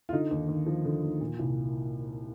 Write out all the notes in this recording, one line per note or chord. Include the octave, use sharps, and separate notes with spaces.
F4
D3 D#4
D#2
D#2
F3
D3
D#2
A#2
C2